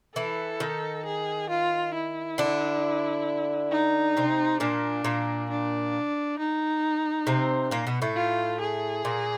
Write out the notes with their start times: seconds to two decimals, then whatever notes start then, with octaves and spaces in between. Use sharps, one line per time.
0.16 E3 E4 A4
0.60 D#3 D#4
1.05 G#4
1.50 F4
1.94 E4
2.38 D3 D4
3.72 D#4
4.17 C3 C4
4.60 A#2 A#3 D4
5.04 A#2 A#3
5.50 D4
6.39 D#4
7.27 C3 C4
7.71 A#2 A#3
7.87 B2 B3
8.02 A2 A3
8.16 F4
8.61 G#4
9.05 A#2 A#3